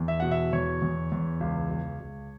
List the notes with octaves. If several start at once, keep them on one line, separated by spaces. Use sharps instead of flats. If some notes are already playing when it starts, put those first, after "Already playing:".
Already playing: E2
E5
B2 F#5
E5
E2 C#5
E2
E2
C#2
C#2
C#2